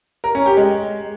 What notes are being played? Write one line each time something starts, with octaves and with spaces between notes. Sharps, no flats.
A#4
C#4
G4
G#3